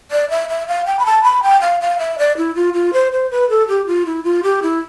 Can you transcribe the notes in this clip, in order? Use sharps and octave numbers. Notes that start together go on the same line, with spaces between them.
D5
E5
E5
F5
G5
B5
A5
B5
G5
F5
F5
E5
D5
E4
F4
F4
C5
C5
B4
A4
G4
F4
E4
F4
G4
E4